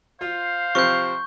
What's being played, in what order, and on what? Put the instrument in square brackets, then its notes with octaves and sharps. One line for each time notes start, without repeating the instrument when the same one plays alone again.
[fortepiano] F4 [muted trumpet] C5 [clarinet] F5
[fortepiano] C3 F3 C4 [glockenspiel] C#6 G6